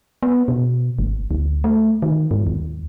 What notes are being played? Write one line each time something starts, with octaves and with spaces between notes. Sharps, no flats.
B3
B2
G#1
D2
A3
D#3
G#2
D#2